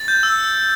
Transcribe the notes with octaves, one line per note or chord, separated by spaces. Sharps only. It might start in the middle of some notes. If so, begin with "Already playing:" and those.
Already playing: A6
G6
E6